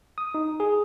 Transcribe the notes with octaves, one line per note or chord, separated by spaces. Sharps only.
D#6
D#4
G#4